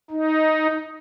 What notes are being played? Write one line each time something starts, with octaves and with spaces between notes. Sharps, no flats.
D#4